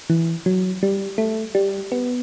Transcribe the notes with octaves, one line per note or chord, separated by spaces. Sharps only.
E3
F#3
G3
A3
G3
B3